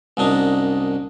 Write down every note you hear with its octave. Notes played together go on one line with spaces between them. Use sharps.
C2 F#2 D4 D#4